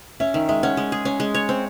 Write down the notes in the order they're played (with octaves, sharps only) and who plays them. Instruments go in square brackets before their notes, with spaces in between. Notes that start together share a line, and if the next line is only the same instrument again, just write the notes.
[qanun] C#4 [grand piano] E5
[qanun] D#3 [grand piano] E5
[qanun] G#3 [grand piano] E5
[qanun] C#4 [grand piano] F#5
[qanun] G#3
G#4
C#4
G#3
C#5
C4